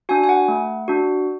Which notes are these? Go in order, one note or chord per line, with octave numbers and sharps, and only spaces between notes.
D4 F#4 G#5
G#5
F#5
A3
D4 F#4